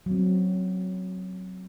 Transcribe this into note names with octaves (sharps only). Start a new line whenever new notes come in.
F#3 C4